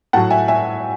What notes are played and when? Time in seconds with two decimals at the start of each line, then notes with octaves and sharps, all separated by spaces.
0.13 A2 F#3 F#5 A5
0.30 E5 G#5
0.48 E5 G#5